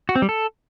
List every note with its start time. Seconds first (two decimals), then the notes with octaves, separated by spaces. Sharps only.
0.09 F#4
0.16 C4
0.22 G3
0.29 A4